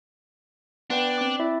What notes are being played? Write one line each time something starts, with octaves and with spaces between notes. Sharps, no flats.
B3 D4 B4 G5
C4 D6
E4 D5 E5